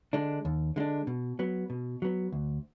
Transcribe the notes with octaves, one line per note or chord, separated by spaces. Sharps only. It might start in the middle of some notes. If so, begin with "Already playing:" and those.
D3 G#3 D4
D#2
D3 G#3 D4
B2
F#3 B3
B2
F#3 B3
D2